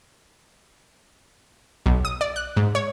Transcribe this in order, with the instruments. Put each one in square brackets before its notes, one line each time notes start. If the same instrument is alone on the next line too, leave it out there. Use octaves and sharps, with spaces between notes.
[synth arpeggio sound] B1
D#6
D5
F#6
G#2
C#5